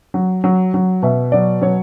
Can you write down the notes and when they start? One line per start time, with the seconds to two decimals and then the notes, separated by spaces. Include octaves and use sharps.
0.14 F#3
0.44 F#3
0.74 F#3
1.02 B2 E5
1.32 F#3 D5
1.61 F#3 C#5